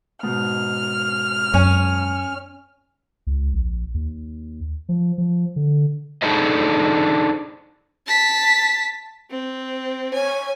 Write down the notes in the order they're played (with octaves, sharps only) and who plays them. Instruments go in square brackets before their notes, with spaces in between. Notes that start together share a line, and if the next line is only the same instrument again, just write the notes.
[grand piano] G#2 B2 [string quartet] F6
[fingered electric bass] F#2 [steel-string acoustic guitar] C#4
[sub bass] C#2
A#1
D#2
F3
F3
D3
[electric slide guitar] D4 D#4 G#4 A4 C5 D#5
[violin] A5 B6
C4
[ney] C#5 [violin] G#5